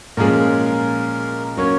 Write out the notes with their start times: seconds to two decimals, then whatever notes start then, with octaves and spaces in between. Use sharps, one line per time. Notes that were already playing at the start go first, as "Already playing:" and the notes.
0.17 A#2 F3 G#3 C#4 G#4 A#4
1.57 F#3 A#3 C#4 C#5